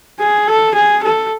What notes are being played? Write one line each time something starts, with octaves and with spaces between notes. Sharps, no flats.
G#4
A4
G#4
A4